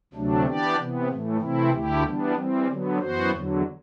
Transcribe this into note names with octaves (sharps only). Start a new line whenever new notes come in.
D2 C3 F#3 A3 D4
E3 B3 D4 G4 D5
C3 E3 B3
A2 E3 A3
C3 E3 A3 C4 E4
D2 D3 A3 E4 G4
E3 G3 B3 D4
E3 G3 C4
D3 F#3 B3
F#2 E3 B3 F#4 C5
E2 D3 F#3